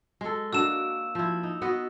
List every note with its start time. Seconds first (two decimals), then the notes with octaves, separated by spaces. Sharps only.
0.21 G#3 A4
0.53 A#3 D4 F#4 E6 E7
1.15 F3 E4
1.43 D#4
1.62 B3 F#4 D#5